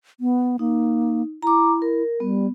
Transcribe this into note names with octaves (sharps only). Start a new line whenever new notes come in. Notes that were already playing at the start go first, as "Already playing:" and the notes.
B3
A#3 D#4
E4 A#5 D6
A#4
G3 B3